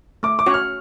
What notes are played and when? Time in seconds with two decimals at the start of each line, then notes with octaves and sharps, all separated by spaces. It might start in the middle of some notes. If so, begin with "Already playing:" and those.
0.23 A3 D6
0.39 D6
0.46 C#4 F#4 C#5 F#5
0.54 F6